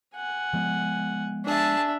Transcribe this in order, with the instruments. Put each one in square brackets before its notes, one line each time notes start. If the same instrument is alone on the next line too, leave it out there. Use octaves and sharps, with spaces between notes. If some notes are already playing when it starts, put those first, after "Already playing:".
[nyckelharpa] F#5 G#5
[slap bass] F3 G#3 B3
[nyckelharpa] D4 E5 [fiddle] G#4 A5